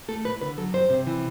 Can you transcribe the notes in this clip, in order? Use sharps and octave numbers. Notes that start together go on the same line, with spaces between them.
A3 A4
A2 B4
D3 B4
F#3 A4
G2 C5
C3
E3